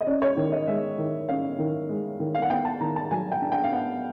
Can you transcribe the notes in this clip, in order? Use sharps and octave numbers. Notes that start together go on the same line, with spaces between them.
D#5
C#4 D5
C#5
D#3
D#5
G#3 E5
D#3
C#4 F5
D#3
G#3
D#3
F5
F#5
B3 G5
A5
D#3 A#5
A5
F#3 G#5
G5
D4
G5
F5
B3 F#5